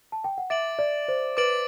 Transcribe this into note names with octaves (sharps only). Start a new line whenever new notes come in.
A5
G5
F#5
E5 D6 A6 D7 F#7
D5
C5
B4 D6 A6 D7 F#7